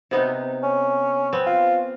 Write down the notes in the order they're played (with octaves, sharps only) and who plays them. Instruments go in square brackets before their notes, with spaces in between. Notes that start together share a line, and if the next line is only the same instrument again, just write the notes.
[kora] C3 B3 D#4
[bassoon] C#4
[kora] B3 C4
[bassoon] F4